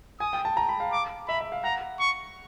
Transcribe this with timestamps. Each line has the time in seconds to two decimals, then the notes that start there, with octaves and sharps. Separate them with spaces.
0.20 G#5 D#6
0.33 G5
0.45 A5
0.57 A#5
0.69 B5
0.80 F5
0.92 D6
1.28 E5 B5
1.41 E5
1.52 F5
1.64 F#5 A#5
2.00 C#6